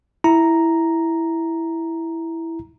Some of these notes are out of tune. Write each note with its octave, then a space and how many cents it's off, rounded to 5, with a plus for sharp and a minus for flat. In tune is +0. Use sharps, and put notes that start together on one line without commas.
E4 +0 A#5 +0